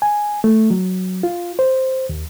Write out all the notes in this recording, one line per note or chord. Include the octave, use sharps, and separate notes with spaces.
G#5
A3
F#3
F4
C5
D#2